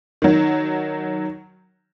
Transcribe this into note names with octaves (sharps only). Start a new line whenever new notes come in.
D#3 F#3